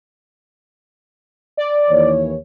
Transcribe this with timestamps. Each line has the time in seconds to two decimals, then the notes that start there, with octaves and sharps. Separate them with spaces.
1.57 D5
1.89 D#2 E3 C#5